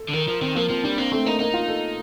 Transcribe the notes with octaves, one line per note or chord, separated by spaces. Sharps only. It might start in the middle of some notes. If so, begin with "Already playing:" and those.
Already playing: A4
D3
D#3 A#4
F3 A#4
D#3 C4
F3 A#3
F3 C4
G3 D4
A#3 C4
A3 C4
A#3 D#4
A#3 D#4
F4
A4